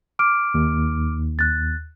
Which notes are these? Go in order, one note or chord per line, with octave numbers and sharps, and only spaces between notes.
D6 F6 D7
D#2
F#6 A6